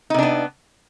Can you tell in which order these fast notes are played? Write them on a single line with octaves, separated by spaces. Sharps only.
D#4 C3 D4 B3